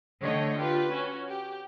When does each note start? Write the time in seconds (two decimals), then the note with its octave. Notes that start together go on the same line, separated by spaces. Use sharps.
0.21 D3 A3 C#5 D#5 G5
0.57 F4 G4 B4
0.92 C#4 F#4
1.29 G4